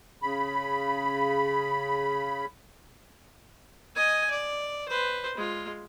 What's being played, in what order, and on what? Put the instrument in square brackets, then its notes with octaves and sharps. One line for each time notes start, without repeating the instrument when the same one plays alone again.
[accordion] C#3 B5
[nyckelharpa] D#5 G#5
D5
B4 C5
G#3 F4